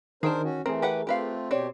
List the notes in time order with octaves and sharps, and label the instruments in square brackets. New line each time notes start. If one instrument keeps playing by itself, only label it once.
[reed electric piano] D#3 [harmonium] D4 A#4 C5 [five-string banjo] G#4 G5 A5
[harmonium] C#4 F#4
[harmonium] E3 A3 [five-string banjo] C4 [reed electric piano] G#4 A#4
[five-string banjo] G4 B4 F#5
[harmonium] A3 C4 F4 [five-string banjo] G4 B4 F5
[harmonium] B2 G4 [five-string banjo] C4 C#5 D5